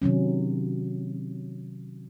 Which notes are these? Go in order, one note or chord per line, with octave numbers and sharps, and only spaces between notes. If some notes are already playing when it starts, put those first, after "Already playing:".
C3 D#3 F#3 C#4